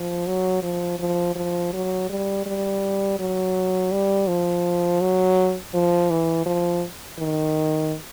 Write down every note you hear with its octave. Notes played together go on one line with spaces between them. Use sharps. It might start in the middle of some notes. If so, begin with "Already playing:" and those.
Already playing: F3
F#3
F3
F3
F3
F#3
G3
G3
F#3
G3
F3
F#3
F3
E3
F3
D#3